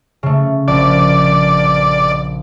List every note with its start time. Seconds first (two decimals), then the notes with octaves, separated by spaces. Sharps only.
0.23 C#3 A3
0.68 A#1 D5